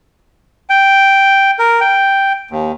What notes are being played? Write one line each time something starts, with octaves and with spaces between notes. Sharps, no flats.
G5
A#4
G5
D#2